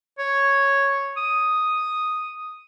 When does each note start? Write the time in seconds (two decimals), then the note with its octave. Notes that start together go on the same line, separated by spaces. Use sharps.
0.19 C#5
1.17 D#6